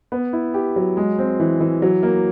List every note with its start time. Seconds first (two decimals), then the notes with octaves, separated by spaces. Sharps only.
0.12 B3
0.33 E4
0.54 G4
0.76 F#3
0.97 G#3
1.19 C4
1.40 E3
1.60 E3
1.82 F#3
2.03 A#3